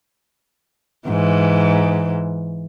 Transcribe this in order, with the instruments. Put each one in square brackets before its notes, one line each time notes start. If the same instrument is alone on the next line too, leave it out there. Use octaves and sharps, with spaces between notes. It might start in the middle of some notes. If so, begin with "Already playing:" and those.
[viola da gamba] G#2 E3